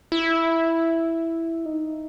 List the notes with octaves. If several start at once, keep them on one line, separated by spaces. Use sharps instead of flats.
E4
D#4